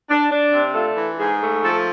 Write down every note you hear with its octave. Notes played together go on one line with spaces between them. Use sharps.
D4
D4
C3
A3 F4
E3
G#2 G#4
A3
F3 A4